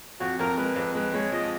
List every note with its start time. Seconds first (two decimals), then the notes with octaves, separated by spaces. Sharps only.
0.20 F2 F#4
0.39 F2 A#4
0.57 G#3 B4
0.76 F2
0.95 G#3 B4
1.14 G#3 C#5
1.32 F3 D#5